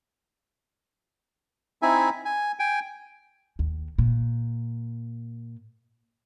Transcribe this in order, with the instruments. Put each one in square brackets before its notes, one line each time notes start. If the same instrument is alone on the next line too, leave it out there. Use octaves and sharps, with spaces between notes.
[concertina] C4 D#4 E4 E5 G#5
G#5
G5 G#5
[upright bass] D#2
A#2